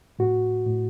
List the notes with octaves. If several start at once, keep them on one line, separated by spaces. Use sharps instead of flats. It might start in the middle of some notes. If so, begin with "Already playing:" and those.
A2 F#4
A2